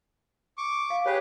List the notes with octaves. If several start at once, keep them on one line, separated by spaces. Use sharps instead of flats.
C#6 D6
F5
G4 G#4 B4 C#5